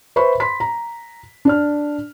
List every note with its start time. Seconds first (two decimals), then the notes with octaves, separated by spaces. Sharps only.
0.16 B4 C5 E5 B5 C#6
0.40 B5 C6 B6
0.60 A#5
1.45 D4 D5 F6